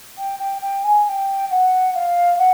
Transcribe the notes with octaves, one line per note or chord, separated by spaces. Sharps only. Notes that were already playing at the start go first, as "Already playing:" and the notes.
G5
G5
G5
G#5
G#5
G5
F#5
F5
F#5